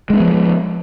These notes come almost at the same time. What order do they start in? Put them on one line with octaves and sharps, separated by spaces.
G#3 D4 B3 F3